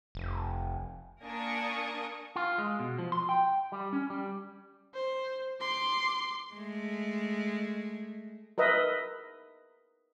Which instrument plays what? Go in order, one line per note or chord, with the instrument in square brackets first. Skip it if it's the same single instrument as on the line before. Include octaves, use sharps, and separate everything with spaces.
[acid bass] F1
[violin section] A#3 D4 A#4 G#5 C#6 D#6
[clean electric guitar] F4
G#3
B2
F3
C6
G5
G3
C#4
G3
[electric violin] C5
C6 D6
[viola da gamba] G#3 A3
[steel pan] A#4 B4 D#5 E5 B5